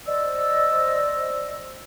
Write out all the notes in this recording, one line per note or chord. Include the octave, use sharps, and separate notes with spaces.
C5 D5 D#5 E6